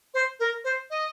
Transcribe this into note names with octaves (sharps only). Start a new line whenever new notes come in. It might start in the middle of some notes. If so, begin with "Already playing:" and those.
C5
A#4
C5
D#5